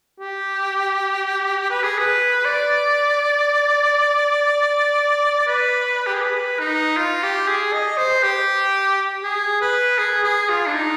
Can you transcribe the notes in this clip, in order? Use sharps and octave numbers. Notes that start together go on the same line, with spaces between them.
G4
B4
G#4
B4
D5
B4
G4
G#4
B4
D#4
F4
G4
G#4
D#5
C5
G4
G#4
B4
G#4
G#4
F4
D4
D#4